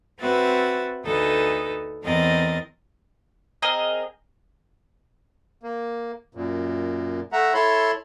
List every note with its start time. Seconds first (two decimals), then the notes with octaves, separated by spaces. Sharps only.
0.18 C4 F#4 B4 E5 A6
1.03 D2 D#4 A4 B4
2.02 E2 C4 A#4 D#5 A6
3.62 C4 G#4 A#4 D#5
5.63 A#3
6.35 F#2 A#2
7.32 A3 E5 F#5 A#5
7.54 E4 A4 C#5 B5 C6